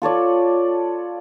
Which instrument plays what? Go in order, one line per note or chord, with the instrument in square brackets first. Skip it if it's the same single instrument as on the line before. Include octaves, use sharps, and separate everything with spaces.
[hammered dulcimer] F4 A4 C#5 D5